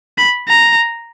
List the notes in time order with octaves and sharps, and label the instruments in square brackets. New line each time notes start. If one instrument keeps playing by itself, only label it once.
[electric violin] B5
A#5